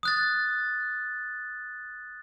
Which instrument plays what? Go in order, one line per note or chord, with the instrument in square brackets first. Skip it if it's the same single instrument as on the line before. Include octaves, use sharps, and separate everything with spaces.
[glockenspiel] D#6 F#6 A6